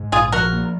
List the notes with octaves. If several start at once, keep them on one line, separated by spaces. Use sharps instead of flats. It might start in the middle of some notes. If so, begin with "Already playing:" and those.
Already playing: G#2
A#1 F4 G#4
F3 F#4 A#4
A#3